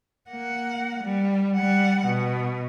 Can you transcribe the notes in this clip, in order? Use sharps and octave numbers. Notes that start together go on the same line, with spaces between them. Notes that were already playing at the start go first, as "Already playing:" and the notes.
A#3 F#5
G3
G3 F#5
B2